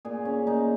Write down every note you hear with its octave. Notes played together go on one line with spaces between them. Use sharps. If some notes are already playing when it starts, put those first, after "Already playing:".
A#2 G#4
C#4
A#2 D#4